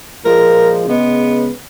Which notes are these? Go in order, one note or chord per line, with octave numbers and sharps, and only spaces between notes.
A#2 F3 G#3 A#4
C#3 G#3 B3